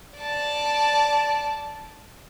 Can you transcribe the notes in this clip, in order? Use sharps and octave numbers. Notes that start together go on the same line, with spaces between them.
D5 A5